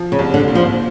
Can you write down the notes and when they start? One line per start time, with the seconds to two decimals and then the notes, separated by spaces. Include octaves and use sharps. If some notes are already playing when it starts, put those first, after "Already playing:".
Already playing: F3
0.12 C#3
0.19 C2
0.34 D3
0.48 A#2
0.55 F3